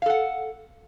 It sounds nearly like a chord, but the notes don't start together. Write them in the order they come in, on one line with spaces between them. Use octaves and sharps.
F5 A4 F#5